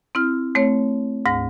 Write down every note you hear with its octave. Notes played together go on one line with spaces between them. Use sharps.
C4 E4 F6
A3 C4 C#5
D2 G#2 A#6